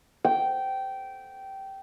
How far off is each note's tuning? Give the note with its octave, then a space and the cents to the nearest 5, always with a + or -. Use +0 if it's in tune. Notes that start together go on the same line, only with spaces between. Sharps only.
G5 -15